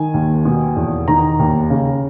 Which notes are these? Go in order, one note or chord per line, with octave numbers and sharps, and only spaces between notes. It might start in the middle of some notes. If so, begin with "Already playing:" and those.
Already playing: D#3 G#5
D#2
B2
E2
D#3 A#5
D#2
C#3